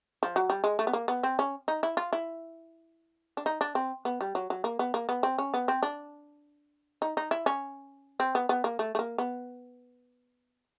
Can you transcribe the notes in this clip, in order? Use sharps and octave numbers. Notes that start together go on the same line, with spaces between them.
F3
F#3
G3
G#3
A3
B3
A#3
B3
C4
C#4
D#4
E4
F4
E4
D4
D#4
D4
C4
B3
G3
F#3
F#3
A#3
B3
A#3
B3
C4
C#4
B3
C4
D4
D#4
D#4
E4
C#4
C4
B3
B3
A#3
A3
A3
A#3
B3